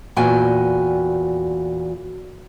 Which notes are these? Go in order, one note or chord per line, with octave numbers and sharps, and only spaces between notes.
E2 A#2 F#4 G5 G#5